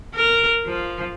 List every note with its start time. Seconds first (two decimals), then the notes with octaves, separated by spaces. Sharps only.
0.15 A#4
0.66 F3